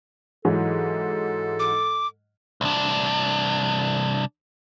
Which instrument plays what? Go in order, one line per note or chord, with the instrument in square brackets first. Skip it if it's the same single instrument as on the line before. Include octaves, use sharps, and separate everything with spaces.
[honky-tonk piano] G#2 E3 F#3 [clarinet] A4
[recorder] D6
[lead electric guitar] C2 D4